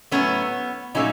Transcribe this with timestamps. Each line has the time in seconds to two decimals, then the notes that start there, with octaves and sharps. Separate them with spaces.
0.11 A2 F#3 A3 B3 C#4
0.95 A#2 F#3 A3 C#4 D#4